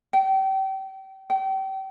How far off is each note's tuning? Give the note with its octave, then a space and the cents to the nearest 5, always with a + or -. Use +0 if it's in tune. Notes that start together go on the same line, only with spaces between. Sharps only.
G5 -30
G5 -35